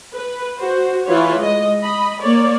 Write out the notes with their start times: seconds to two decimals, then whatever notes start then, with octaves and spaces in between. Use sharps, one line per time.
0.14 B4
0.59 F#4 C5
1.06 E3 E4 F4 B4 C#5
1.41 G#3 D#5
1.79 D#5 B5
2.20 A#3 C#5 D5